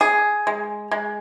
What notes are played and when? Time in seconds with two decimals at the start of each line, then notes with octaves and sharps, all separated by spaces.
0.01 G#4
0.47 G#3
0.91 G#3